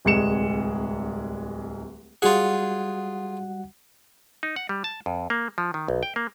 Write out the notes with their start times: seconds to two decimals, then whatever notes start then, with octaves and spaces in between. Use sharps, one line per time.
0.05 D1 C2 G#3 G#4 C#7 E7
2.22 G3 F4 F#4 G#4 F#5
4.43 D#4
4.56 F#5
4.69 G3
4.84 A5
5.06 F2
5.30 A#3
5.58 F3
5.74 D#3
5.88 B1
6.03 G5
6.16 A#3